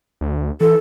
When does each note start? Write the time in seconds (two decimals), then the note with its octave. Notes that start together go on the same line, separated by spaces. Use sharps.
0.21 D2
0.61 E3 A4